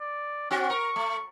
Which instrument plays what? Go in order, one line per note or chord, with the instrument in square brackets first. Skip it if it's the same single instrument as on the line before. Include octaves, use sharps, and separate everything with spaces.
[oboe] D5
[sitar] C4 F#4 [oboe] D4
[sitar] A#4 [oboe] C#6
[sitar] A3